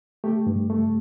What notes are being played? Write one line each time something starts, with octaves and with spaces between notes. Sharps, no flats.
A3 G4
G2
A3